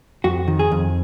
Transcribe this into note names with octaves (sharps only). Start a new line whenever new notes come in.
F2 F#4
D#3
G#4
F2